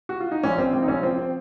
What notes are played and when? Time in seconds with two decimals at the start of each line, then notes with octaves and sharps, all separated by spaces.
0.09 F#4
0.20 F4
0.32 D#4
0.43 A#1 C#4
0.58 A#1 C4
0.73 A#1 C4
0.82 D#4
0.88 A#1 C#4
1.03 F3 C4
1.18 C4